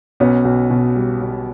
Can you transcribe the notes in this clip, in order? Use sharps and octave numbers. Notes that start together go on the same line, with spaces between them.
B1 B3 C#4
B1
B2
G3
B1